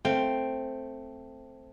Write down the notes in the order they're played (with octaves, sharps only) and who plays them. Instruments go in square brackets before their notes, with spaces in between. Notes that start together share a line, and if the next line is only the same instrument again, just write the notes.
[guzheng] A3 C4 F5 G5